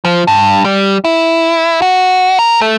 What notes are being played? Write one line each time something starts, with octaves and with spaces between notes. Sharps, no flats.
F3
G2
G3
E4
F#4
A#4
A3